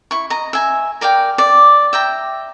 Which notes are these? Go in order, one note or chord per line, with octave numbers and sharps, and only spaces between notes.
E4 C#6
D#5 A#5
E5 G#5
A#4 D5 F5 G5
D5
E5 G5 A#5